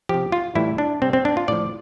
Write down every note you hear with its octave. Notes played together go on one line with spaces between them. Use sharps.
C3 F3 G4
F4
A2 E3 G3 E4
D4
C3 G3 C4
C4
D4
F4
A2 F3 D5